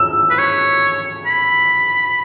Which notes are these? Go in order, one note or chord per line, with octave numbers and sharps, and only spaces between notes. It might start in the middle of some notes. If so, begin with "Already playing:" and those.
Already playing: E6
B4
C#5
B5